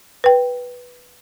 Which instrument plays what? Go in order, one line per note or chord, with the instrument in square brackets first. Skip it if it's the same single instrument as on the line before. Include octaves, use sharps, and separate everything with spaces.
[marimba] B4 G5